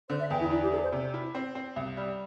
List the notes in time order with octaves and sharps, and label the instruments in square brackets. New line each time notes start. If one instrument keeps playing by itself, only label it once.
[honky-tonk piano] D3 [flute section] C5
[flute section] E5
[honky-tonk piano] E2 [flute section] G5
[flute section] E4
[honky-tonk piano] D4 [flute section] E4
[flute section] G4
[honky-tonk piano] D4 [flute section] A4
[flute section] C5
[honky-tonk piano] C3
E4
C4
C4
C2
G3